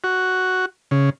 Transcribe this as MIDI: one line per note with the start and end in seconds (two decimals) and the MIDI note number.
0.04 0.66 66
0.91 1.10 49